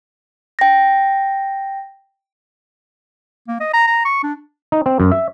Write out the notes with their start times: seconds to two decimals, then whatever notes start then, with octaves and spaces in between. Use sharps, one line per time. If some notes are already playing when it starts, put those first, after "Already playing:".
0.59 G5 A#6
3.48 A#3
3.60 D#5
3.73 A#5
3.87 A#5
4.05 C#6
4.23 D4
4.72 D#4
4.86 C4
5.00 F#2
5.11 E5